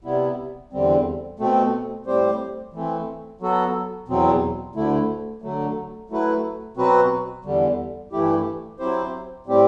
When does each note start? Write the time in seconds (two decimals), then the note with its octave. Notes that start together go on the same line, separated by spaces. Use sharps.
0.04 C3 G3 B3 E4
0.72 E2 D3 G3 C4
1.39 B2 A3 C4
2.06 A2 G3 C4 G4 C5
2.73 E3 A3 C4
3.41 F#3 B3 F#4 A4
4.08 E2 B2 F#3 C4
4.75 D2 D3 A3 E4
5.42 D3 F#3 A3
6.10 F#3 A3 E4 B4
6.77 B2 F#3 C4 F#4 B4
7.45 E2 D3 G3
8.12 G2 E3 A3 E4 G4
8.79 F#3 C4 E4 G4 C5
9.46 A2 G3 C4 G4